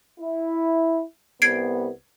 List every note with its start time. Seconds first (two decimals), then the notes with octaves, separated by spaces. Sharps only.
0.20 E4
1.42 C2 B3 G#6 C7 D7